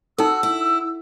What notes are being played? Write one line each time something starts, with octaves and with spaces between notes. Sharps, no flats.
D#4 F#4 A4 E6
E4